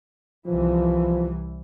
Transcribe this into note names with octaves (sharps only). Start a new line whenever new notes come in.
C2 E3 F3